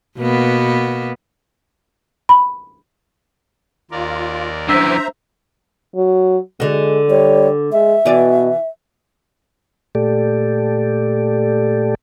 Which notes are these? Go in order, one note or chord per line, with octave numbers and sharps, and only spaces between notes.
B2 A#3 B3
B5
D#2 F4 A#4 D5
F#2 E3 D4 C5 E5 A#5 E6 B6
F#3
D3 G#3 F#4
G3 C#5
G#3 E5
B2 E3 D5
A#2 A3 G4 A4 D5